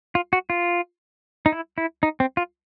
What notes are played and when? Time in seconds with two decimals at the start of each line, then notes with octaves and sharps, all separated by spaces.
0.15 F4
0.33 F#4
0.50 F4
1.46 D#4
1.52 E4
1.78 E4
2.03 D#4
2.20 C4
2.37 F4